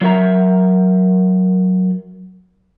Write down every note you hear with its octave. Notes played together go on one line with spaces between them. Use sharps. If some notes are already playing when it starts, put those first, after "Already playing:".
F#3 F#4 A#4 E5 A#5